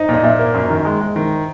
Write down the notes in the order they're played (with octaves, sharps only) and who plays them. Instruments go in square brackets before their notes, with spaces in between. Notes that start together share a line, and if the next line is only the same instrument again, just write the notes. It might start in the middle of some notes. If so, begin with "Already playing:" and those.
Already playing: [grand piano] D#4 [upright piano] C5 D#5
[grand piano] A#2
[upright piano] D#5
[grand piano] A#2 [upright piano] E5
[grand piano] A#3
F#2
D#3
G#3
G#3
D#3